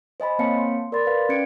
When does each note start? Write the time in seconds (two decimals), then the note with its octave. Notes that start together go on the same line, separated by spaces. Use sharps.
0.20 C5 D#5 G#5 B5
0.39 A#3 C4 C#5 F5 A5 C#7
0.57 C6
0.92 A#4 D5 B5 C6 A6
1.05 B4 D5 F5
1.29 C#4 G#6 C#7 D7